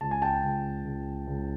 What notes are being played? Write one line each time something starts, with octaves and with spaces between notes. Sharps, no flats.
C#2 A5
G#5
G5 A5
C#2
C#2
C#2